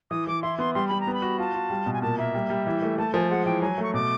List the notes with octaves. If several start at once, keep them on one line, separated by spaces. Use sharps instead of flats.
E3 D#6
E3 D6
E4 C6
B3 C6
G3 C6
G3 B5
A#5
B3
B5
F#4
F4 A5
F4
G3
B2
G#5
A#2 A5
A#3 E5
G3
G3
E3
A3
A3 A5
F3 G#5
G#3 F#5
E3 G5
F#3 G#5
A3
C#6
B2 D6